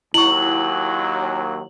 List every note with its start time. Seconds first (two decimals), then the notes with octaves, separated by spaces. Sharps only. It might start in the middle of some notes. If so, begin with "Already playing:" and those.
0.14 D#2 F#3 E4 C#6 F#7